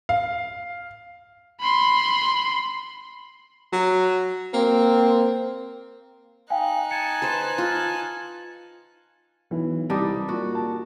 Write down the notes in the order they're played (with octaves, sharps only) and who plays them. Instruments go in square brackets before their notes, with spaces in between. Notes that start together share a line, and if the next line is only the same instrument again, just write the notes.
[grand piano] F5
[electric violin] B5 C6
[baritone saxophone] F#3
[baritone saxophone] A#3 [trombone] C4
[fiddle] D#4 F#6 [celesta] F5 G5 G#5
[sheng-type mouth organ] G#5 A5 [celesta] C#7
[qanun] B4 C5
F4
[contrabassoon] B1 [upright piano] E3
[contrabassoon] C2 [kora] G3 D#4 [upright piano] A5 D6 D#6
[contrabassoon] A#2 [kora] F#4
[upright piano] A5